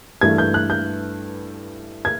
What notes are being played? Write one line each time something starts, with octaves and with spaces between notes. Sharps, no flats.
G2 E3 A3 G#6
G6
F#6
G6
G#6